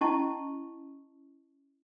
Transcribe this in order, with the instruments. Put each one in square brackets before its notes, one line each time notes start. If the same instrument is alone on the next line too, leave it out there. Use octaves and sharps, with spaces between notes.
[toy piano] C#4 E4 D#5 A5 C#6